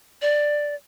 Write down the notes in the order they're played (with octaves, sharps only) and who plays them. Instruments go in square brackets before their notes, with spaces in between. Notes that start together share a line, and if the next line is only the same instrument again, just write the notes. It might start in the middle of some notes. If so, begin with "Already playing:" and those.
[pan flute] D5